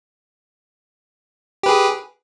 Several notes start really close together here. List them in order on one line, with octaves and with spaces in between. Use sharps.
G4 B4 G#4